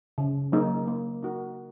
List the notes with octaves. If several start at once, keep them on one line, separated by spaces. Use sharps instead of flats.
C#3
F#3 A#3 D#4 G#4
A#3
D#4 F#4 A#4